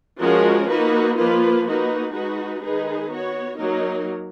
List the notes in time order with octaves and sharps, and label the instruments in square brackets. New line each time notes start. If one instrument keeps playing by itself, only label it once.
[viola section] F3 G#3 C#4 F#4 A#4
A#3 D#4 F#4 B4
F3 A#3 F4 B4
A#3 D#4 F#4 B4
G#3 D#4 F#4 B4
D#3 G#3 D#4 G#4 B4
B3 F#4 C#5
F#3 A#3 D#4 A#4